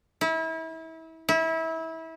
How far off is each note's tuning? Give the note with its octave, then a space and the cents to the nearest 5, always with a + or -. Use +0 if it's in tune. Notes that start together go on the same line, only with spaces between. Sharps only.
E4 -30
E4 -25